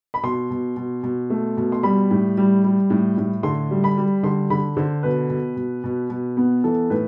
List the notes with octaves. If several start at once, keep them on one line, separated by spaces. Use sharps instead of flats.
B5
B2 C6
B2
B2
B2
A3
B2
C6
G3 B5
A2
G3
G3
A2
A2
D3 C6
G3
B5
G3
D3 C6
D3 B5
D3 C5
B2 B4
B2
B2
B2
B2
B3
E3 A4
A2 B4